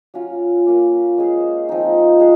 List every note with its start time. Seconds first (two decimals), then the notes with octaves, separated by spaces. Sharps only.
0.14 F#3 C#4 F4
0.66 A#3 C#4 F4
1.18 G#3 C#4 G#4 C5
1.69 F3 C4 D#4
2.20 G#3 G#4